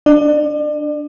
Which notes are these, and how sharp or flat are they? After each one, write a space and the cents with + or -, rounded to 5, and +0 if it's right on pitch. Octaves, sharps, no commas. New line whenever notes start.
D4 +0 D5 +35